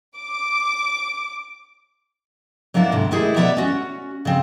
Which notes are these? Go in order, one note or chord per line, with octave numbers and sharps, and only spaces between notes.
D6
F#3 A#3 B3 D4 E4
D2 G#2 C3 A#5
D#3 G3 A3 E4 G#4
B2 B3 D5 E5 A#5
C#4 F#4
C#3 C4